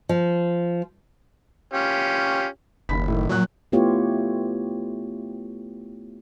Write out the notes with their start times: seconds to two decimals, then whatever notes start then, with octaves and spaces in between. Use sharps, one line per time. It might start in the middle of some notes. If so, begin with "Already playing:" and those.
0.09 F3
1.73 C#4 F4 G4
2.89 F#1 D#2 B5 B6
3.08 A2 D#3
3.29 A#2 F#3 F#6
3.72 A3 B3 E4 F4 G4 C#5